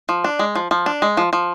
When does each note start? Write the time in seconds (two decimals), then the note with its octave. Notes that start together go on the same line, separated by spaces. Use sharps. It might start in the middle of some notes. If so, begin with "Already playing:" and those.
0.09 F3
0.24 D4
0.39 G#3
0.55 F3
0.71 F3
0.86 D4
1.02 G#3
1.17 F3
1.33 F3